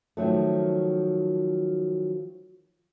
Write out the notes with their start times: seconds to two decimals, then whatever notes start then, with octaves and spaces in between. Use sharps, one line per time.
0.17 D#3 F3 F#3 A3